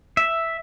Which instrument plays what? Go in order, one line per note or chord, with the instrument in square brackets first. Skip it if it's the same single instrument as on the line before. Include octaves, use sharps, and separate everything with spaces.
[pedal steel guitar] E5